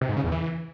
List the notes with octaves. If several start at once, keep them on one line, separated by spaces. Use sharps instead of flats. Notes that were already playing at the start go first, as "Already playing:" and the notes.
C3
G#2
C#3
E2
E3